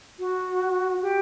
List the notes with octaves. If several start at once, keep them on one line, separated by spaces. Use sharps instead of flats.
F#4
G4